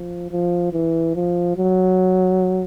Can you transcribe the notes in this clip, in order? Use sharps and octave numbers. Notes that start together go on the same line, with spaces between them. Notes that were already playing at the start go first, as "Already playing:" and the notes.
Already playing: F3
F3
E3
F3
F#3